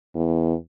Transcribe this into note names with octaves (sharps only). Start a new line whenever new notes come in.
E2